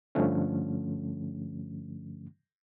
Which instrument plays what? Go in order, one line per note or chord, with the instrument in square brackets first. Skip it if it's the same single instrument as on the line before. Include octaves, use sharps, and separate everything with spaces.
[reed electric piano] G2 D3 F3 A3 C#4